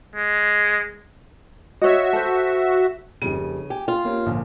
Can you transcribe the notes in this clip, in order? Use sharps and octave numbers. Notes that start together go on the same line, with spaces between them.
G#3
F#4 C#5 D#5 E5
A4 C5
F1 C#3 G3 D#7
G4 G#5
F4
A#3 C#4 G4
A#1 A#2 D3